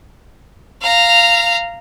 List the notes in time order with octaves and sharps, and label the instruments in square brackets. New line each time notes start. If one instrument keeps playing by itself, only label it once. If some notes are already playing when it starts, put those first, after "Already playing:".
[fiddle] F5 A#5